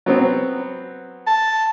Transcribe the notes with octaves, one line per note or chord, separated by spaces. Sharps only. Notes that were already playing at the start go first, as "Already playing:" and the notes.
F#3 B3 C4
A5